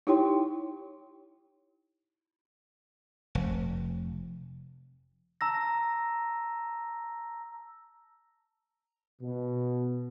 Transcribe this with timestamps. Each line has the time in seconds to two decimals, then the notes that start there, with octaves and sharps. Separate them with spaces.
0.07 D#4 E4 G4 C#5 G5 C6
3.35 F1
5.41 A5 A#5 E6 A#6
9.21 B2